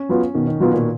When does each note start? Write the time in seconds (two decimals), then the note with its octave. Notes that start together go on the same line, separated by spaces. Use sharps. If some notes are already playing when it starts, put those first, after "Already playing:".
Already playing: C#4
0.09 F#3 B3 F4
0.34 B2 D#3
0.47 D#3
0.60 B2 F#3 B3 F4
0.73 A#2